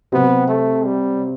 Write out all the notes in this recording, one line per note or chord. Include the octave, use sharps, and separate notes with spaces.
C3 F#3 B3 C4
A3
G3